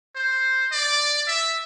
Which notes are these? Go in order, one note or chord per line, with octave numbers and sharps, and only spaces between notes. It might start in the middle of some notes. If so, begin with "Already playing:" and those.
C5
D5
E5